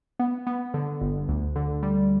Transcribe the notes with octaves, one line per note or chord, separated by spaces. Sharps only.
B3
B3
D3
G1
D2
D3
G3